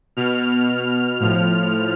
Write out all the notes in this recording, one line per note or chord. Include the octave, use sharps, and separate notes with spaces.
B2 F6
A2 F3 F6